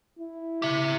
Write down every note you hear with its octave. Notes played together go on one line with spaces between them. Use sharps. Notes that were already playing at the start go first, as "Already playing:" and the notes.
E4
G4 E5